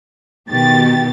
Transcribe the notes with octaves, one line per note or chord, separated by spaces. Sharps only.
B2 D#3 G4 A6